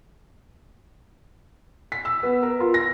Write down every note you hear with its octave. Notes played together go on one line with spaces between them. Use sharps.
B6
E6
B3
A#4
F4
A#6